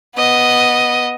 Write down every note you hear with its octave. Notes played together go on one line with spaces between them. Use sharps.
B3 D#5